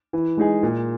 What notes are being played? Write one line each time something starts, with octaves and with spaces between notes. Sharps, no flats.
E3
G#3 D#4 G#4
A#2